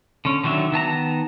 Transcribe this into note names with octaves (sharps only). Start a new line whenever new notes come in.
D3 C#4
D3 D#3 F#3 D4 E5
D#3 B3 A5 A#5